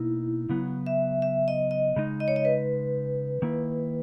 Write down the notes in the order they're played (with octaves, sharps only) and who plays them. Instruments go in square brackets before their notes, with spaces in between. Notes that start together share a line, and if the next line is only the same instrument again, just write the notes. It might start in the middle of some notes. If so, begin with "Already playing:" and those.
Already playing: [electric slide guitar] B2 A#3 D#4 [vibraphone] E4
[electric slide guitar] C#3 F#3 B3
[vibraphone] E5
E5
D#5
D#5
[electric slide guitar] C#3 G#3 D#4
[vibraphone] D#5
C#5
D#5
B4
[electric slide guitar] D#3 A#3 E4